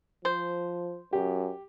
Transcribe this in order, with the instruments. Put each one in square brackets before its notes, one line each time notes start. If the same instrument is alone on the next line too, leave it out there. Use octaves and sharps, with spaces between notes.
[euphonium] F3 [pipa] C5
[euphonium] F#2 [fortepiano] G4